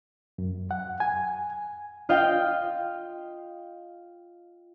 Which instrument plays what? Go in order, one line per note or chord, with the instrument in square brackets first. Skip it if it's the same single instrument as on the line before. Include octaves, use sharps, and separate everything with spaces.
[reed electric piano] F#2
F#5
G#5
[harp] F4 D#5 F5 G5